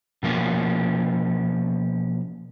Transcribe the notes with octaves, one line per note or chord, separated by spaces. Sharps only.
B2 F3 A#3 C#4